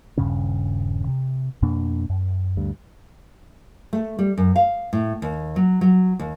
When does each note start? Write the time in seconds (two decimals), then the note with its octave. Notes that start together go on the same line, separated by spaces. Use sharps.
0.18 D#1 G2 C#3 C#4
1.07 C3
1.62 F2 B2 A#3 D4
2.10 F#2
2.57 D2 G2
3.93 A3
4.19 G3
4.38 F#2
4.56 F5
4.93 A2
5.22 D#2
5.56 F#3
5.81 F#3
6.19 D#2